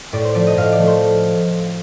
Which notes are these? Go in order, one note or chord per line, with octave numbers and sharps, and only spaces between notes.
A2 D5
C5
F3 A3 D5
D#5
A2 F5
D5
F3 A3
C5